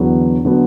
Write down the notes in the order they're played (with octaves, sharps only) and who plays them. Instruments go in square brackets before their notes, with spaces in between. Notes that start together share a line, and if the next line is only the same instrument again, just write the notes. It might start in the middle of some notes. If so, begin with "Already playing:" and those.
Already playing: [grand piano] E2 D3 F#3 B3
D3 F#3 B3